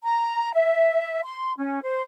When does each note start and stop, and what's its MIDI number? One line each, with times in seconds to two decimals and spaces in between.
0.03 0.51 82
0.53 1.20 76
1.24 1.52 84
1.58 1.80 61
1.83 2.02 72